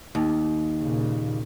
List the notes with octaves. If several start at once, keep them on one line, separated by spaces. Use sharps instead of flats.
D#2
A#2 C#3